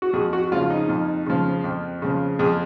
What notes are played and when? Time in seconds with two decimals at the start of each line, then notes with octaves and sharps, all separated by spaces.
0.02 F#4
0.13 F2 G#4
0.33 F#4
0.52 C#3 F3 F4
0.70 D#4
0.89 F2
1.26 C#3 F3
1.64 F2
2.02 C#3 F3
2.39 F2 G#4